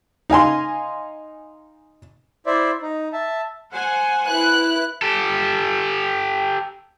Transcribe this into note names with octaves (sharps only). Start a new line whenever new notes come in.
D#4 F5 G#5 C6
E4 C5 D5 E5
D#4
E5 A5
C5 F#5 G#5
E4 B4 F#6
G4 A4